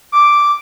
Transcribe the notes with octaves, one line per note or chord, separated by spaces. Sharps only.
D6